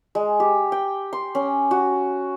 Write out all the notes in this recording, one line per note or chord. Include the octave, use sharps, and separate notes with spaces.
G#3
G4
G5
C6
C#4
F#4